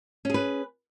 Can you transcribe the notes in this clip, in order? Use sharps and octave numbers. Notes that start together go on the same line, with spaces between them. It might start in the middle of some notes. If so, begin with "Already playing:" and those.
C#4 G#4 B4